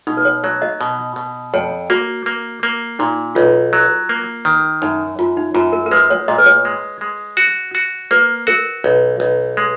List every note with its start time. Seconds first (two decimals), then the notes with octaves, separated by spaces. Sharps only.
0.07 B2 D#4
0.17 B4
0.25 C#5
0.43 F#3 C#5
0.62 D#5
0.81 B2
1.16 B2
1.54 F2 C#5
1.90 A#3 F#4
2.26 A#3
2.63 A#3
2.99 A#2 D#4
3.35 B1 F4
3.73 F#3
4.09 A#3
4.45 D#3
4.82 F#2 D#4
5.19 F#2 F4
5.37 D#4
5.55 F#2 F4
5.73 A#4
5.86 A#4
5.91 G#3 B4
6.10 C#5
6.28 A#2 D#5
6.38 B4
6.46 C#5
6.65 G#3
7.01 G#3
7.37 F#4
7.75 F#4
8.11 A#3 B4
8.47 F#4 A#4
8.84 B1
9.20 B1
9.57 G#3